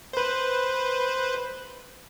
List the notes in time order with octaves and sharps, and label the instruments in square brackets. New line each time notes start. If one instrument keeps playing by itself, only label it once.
[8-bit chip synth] B4 C5